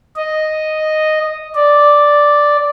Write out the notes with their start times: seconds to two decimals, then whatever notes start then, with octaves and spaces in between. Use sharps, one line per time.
0.16 D#5
1.55 D5